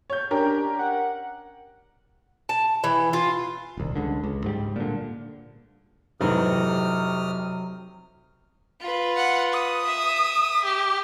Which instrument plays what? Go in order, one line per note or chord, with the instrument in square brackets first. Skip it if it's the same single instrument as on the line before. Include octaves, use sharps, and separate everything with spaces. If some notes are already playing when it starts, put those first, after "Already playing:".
[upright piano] C#5 G6
[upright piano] C#4 G4 A#4 [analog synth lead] D4
[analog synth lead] F#5
[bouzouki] A5
E3
F4
[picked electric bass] D#1 C2
C#2 D3
C#2
G#2 F#3 G3
A#2 D3
[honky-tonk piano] F1 [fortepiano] G#2 E3 C4 [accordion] C3 D#6 F6 [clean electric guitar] F#3
[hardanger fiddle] F4 B4
[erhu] F#5
D#6
[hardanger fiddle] E5
[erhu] G4